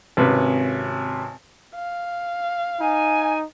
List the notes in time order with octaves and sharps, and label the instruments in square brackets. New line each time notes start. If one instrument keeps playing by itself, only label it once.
[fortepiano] G#1 C3 C#4 B4
[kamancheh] F5
[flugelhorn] D#4 [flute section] G#5